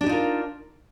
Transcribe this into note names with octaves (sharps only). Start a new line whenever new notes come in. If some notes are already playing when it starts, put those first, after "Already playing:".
D4 D#4 F4 G4 A#4